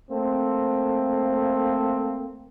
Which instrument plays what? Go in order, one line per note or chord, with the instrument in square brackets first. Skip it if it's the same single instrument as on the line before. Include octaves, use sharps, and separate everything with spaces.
[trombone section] A3 A#3 C4